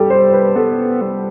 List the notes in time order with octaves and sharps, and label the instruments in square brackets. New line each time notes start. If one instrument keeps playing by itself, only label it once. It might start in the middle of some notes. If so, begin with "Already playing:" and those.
Already playing: [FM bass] G3 [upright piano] G4 A4
[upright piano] C5
B4
[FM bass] B3 [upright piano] A4
[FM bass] G3